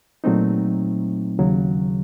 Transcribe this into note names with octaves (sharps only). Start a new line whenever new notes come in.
A#2 F#3 A3 C4 D#4
D#2 C#3 F#3